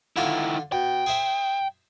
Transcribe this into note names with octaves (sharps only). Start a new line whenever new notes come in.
D3 D#3 E4 F4 D5
B2 G5
G#4 C5 E5